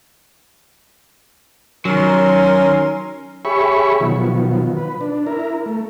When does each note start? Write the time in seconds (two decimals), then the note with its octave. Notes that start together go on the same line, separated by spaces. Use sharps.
1.85 D#3 F#3 C#4 A#4 C6
3.45 G4 G#4 C#5 E5 B5 C#6
4.00 B2 D#3 F3 F#3
4.77 B4
5.01 D4
5.27 E4 A#4
5.66 A3